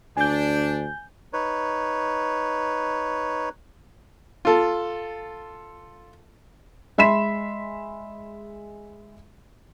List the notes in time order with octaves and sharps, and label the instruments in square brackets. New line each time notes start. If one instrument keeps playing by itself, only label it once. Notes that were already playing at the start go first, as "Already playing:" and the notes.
[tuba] D2 [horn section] D4 [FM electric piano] G#5 G6
[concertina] D#4 B4 C#5
[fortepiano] F4 A4
[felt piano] G#3 E5 B5 C6 B6 E7